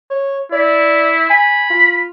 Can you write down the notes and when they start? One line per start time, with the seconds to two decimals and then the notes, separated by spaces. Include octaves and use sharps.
0.10 C#5
0.52 E4 D5
1.30 G#5 B5
1.70 F4